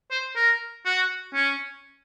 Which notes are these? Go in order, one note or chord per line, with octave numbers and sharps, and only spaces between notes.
C5
A#4
F#4
C#4